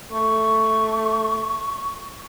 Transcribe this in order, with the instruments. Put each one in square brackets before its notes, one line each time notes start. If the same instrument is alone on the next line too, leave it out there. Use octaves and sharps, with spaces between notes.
[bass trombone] A3 [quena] C#6